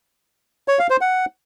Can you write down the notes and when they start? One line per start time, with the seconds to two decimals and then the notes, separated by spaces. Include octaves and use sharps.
0.68 C#5
0.79 F5
0.90 C5
1.01 F#5